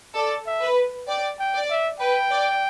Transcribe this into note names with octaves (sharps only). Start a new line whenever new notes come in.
A4 D5
E5
B4
D5 G5
G5
D5
E5
B4 G5
D5